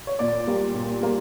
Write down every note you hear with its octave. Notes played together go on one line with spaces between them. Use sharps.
C#5
A#2 D5
G3 A#3
A#2
G3 A#3